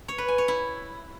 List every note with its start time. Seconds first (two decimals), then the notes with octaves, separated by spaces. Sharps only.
0.08 C#5
0.18 B4
0.28 G#5
0.38 C#5
0.48 E4